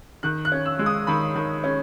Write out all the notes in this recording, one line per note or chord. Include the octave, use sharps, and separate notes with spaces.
D#3 F#6
F#6
C#4
E6
G#3
D#6
D#3 B5
D#3
C#4